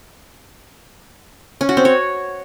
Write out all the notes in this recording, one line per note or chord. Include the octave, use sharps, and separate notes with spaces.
C#4
F#4
C4
C#5